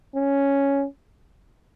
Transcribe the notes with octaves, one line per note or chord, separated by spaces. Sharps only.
C#4